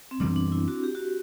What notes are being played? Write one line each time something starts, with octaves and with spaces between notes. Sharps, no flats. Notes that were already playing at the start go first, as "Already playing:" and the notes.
C4
F#2 E3 G3 B3 D4
D4
E4
F#4
G4
F#4